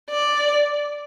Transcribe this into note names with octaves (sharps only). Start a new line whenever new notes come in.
D5